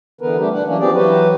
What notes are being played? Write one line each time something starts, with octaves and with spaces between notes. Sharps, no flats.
D3 E3 B3 A#4 B4
G3 A3 D4 G4
D4 F#5
E3 F#3 A#3 C#4 D4
F3 B3 C4 G4 G#4 D5
E3 F#3 F#4 G4 B4